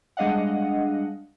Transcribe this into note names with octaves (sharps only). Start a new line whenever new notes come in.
G3 G#3 D4 D#5 F5 F#5